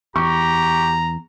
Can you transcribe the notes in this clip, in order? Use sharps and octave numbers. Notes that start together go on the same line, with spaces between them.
E2 G4 A#5 C#6